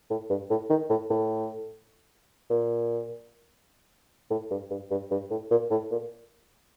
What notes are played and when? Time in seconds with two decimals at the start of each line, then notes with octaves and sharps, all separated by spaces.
0.10 A2
0.30 G2
0.50 A2
0.70 D#3
0.90 A2
1.10 A2
2.50 A#2
4.30 A2
4.51 G2
4.71 G2
4.91 G2
5.11 G2
5.31 A2
5.51 A#2
5.71 A2
5.91 A#2